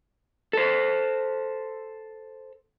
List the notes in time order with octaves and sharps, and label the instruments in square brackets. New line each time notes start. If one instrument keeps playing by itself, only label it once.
[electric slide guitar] A4 C5